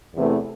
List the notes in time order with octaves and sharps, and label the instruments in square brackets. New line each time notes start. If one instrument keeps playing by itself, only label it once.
[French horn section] E2 C3 E3 A3